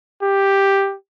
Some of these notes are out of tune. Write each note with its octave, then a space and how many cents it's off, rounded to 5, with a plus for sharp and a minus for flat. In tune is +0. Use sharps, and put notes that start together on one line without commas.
G4 +5